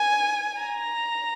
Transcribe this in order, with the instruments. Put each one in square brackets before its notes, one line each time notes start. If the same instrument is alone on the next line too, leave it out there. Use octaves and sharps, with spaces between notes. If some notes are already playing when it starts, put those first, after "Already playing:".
Already playing: [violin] G#5
A#5